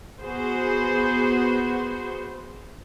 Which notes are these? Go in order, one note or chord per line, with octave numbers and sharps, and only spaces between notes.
B3 F#4 G#4 B4 C5